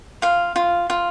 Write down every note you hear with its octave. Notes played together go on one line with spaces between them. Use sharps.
F4 F5
F4
F4